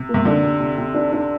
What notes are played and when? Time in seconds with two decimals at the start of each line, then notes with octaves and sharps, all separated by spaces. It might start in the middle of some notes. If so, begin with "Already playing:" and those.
Already playing: C3
0.09 A#3
0.14 C3
0.25 D3 D4
0.44 C3
0.60 C3
0.78 C3
0.95 D4
1.12 D4